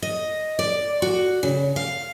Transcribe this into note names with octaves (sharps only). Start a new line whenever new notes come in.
D#5
D5
F#4
C#3
F5